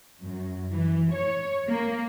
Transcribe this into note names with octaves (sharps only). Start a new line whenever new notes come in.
F#2
E3
C#5
A#3